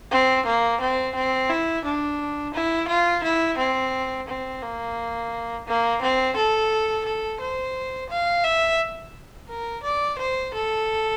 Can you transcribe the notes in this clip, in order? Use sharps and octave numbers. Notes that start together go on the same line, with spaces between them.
C4
A#3
C4
C4
E4
D4
E4
F4
E4
C4
C4
A#3
A#3
C4
A4
A4
C5
F5
E5
A#4
D5
C5
A4